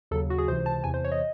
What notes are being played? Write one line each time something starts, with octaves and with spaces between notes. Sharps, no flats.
D#2 C#3 F#3 A4
F#4
G#4
C#2 C3 E3 C5
A5
E2 C3 E3 G#5
C5
C#5
D#5